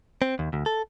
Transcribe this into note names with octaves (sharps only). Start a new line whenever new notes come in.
C4
D#2
D2
A4